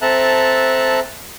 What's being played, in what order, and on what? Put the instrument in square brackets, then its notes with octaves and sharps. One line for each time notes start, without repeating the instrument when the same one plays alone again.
[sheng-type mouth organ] C4 A4 E5 A5 A#5 F#6